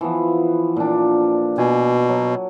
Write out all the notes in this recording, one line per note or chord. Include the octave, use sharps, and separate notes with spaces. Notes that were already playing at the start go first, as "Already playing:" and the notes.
E3 F3 B3
A#2 D4
B2 G#5
F#3